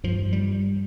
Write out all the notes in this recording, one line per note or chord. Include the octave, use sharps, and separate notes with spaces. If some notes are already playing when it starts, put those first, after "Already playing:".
G2 F3
G3